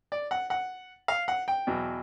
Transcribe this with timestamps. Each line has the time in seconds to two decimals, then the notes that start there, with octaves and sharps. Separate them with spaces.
0.12 D5
0.31 F#5
0.50 F#5
1.08 F5
1.28 F#5
1.48 G5
1.67 E2 B2 F#3